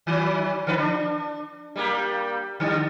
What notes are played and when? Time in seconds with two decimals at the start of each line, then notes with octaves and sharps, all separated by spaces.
0.07 D#3 F#3
0.67 D3 F3 B4
0.79 D4
1.76 G3 A#3 G4
2.60 D3 G3